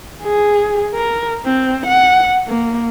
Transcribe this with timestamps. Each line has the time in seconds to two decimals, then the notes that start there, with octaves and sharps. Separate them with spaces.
0.23 G#4
0.95 A#4
1.45 C4
1.86 F#5
2.48 A#3